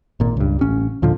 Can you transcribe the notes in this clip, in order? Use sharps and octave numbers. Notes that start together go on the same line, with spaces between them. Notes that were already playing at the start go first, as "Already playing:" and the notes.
G#1 A#2
C#2 G2
A1 C#4
D#2 A#2 D3 F3